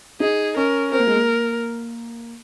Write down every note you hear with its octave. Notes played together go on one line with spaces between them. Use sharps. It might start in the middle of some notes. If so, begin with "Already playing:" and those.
D#4 G#4
C#4 A#4
C4 A#4
A#3
G#3
A#3